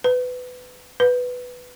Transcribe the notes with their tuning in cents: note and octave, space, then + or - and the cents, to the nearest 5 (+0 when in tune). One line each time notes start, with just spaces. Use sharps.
B4 +20
B4 +5